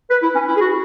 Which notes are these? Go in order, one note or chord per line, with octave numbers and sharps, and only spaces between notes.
B4
E4
C#4
E4
G#4
F#4